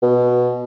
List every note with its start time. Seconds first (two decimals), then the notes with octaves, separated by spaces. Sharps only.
0.03 B2